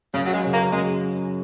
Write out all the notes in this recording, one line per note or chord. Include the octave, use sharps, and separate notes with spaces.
F#2 C#3
F#3
G#3
C#3 F#3
A#3
F#2 G#3